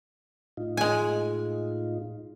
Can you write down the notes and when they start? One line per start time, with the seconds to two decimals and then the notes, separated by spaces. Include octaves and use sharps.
0.57 A2 D#4 F4
0.77 G#3 G#5